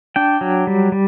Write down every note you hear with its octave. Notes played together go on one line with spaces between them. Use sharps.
D4 G5
F#3
G3
G3